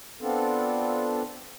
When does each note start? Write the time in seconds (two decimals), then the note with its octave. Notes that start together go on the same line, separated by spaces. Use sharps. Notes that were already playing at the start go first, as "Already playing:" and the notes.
0.21 B3 C4 D4 F4 A4